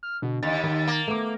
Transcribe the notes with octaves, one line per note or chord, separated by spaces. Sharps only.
F6
B2 D3
D#2 A6
D#3
A#3
A3 B3 D6